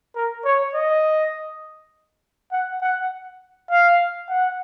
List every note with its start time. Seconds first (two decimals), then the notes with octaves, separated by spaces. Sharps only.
0.16 A#4
0.45 C#5
0.75 D#5
2.52 F#5
2.82 F#5
3.71 F5
4.29 F#5